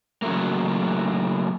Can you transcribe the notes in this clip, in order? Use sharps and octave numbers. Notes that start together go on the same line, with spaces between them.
C#3 F#3 A3 A#3